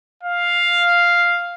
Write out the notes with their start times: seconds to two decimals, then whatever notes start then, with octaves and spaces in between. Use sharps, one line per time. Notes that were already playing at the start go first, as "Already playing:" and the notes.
0.23 F5